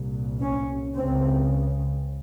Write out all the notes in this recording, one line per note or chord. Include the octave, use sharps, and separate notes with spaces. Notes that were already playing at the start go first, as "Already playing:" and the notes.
Already playing: C2 A#2
C#4
C#2 C#3 C4